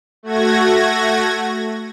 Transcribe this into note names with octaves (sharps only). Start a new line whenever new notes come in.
A3 F#4 G#6 A#6